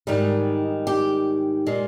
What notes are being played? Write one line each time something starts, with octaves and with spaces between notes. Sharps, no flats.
G#2 D#3 G3 D#4
G4
A#2 G#3